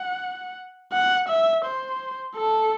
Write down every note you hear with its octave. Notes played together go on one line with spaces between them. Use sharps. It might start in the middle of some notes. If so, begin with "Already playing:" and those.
Already playing: F#5
F#5
E5
C5
A4